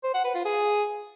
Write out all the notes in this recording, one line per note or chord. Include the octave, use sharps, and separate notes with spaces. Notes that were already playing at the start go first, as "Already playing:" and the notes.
C5
F#5
B4
F4
G#4